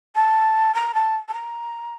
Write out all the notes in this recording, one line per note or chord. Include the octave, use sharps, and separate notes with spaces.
A5
A#5
A5
A5
A#5